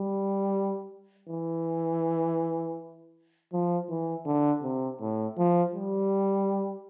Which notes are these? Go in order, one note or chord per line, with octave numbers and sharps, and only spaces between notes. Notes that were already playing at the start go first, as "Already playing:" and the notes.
Already playing: G3
E3
F3
E3
D3
C3
A2
F3
G3